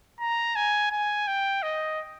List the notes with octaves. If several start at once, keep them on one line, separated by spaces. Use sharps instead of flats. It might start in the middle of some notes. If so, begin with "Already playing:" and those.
A#5
G#5
G#5
G5
D#5